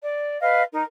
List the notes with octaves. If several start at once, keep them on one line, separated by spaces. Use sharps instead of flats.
D5
B4 D#5 F5
D#4 A#4